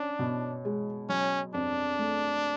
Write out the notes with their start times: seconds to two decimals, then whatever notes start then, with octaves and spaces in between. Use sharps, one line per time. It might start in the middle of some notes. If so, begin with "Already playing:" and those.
Already playing: C#4 D4
0.19 B2
0.65 G#3
1.09 F#3 C#4
1.54 F2 D4
1.99 A3